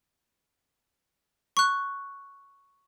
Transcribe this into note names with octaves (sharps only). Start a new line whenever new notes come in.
C#6 F#6